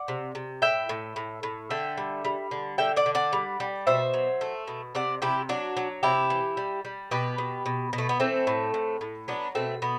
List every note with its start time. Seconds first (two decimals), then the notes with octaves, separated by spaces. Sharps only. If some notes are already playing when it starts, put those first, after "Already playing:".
Already playing: D5 F#5
0.08 C3
0.35 C3
0.62 A2 E5 G5
0.89 A2
1.16 A2
1.43 A2
1.70 D3 E5 G5
1.97 G3
2.25 G3
2.51 D3
2.78 D3 E5 G5
2.96 D5 F#5
3.06 D3
3.15 D5 F#5
3.33 G3
3.60 G3
3.87 B2 C5 E5
4.14 F#3
4.41 A3
4.68 B2
4.95 C3 D5 F#5
5.22 C3 E4 G4
5.49 F#3 D4 F#4
5.77 F#3
6.03 C3 E4 G4
6.30 E3
6.57 G3
6.85 G3
7.11 B2 G4 B4
7.38 B2
7.66 B2
7.93 B2
7.98 A3
8.09 B3
8.20 E3 A3 C4
8.47 A2
8.74 A2
9.01 A2
9.28 F#3 B3 D4
9.55 B2 A3 C4
9.82 B2 B3